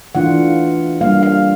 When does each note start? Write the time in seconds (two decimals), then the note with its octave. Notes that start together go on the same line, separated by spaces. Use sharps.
0.15 E3 A3 D4 F4 F#5
1.01 G3 A#3 D4 F5
1.23 F5